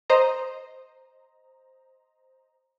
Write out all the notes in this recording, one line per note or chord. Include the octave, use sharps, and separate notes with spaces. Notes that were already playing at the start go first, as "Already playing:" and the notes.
C5 D#5 A#5